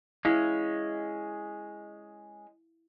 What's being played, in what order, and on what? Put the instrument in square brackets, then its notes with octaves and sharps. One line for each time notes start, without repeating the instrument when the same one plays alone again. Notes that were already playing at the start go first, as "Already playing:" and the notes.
[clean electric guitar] G#3 C#4 [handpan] E4 F5